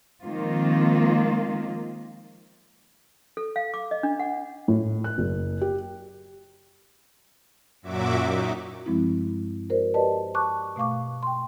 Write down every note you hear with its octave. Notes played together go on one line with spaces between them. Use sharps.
D#3 F3 G#3 A#3 C4 F4
A4
F5
D6
D#5
D4
F#5
A2
F#6
F#1
G4
F#2 A#2 F#3 F#4 E5 D6
D#4
G2 F3 G#3 C4 E4
F#4 A#4 C5 D5
G4 B4 D5 D#5 A5
A5 C#6 D6 F#6
B2 A3 F5 C#6 D6
G5 C6